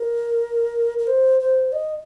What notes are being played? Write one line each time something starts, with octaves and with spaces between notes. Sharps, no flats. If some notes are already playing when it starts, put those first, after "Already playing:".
Already playing: A#4
A#4
C5
C5
D#5